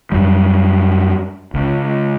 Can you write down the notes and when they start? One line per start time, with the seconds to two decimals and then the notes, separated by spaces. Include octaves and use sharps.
0.12 F#2 G3
1.54 C#2